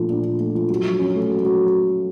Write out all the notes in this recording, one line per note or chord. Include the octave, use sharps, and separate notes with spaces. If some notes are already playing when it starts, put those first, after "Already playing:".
Already playing: A#2 F3 A3 D4
D4
A#2
A3
F3
F#3
F#3
C#4
A3
F#3
F#3